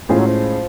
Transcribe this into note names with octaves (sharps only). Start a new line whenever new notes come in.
A2 F3 G#3 C#4 F4 G#4
F#3
F3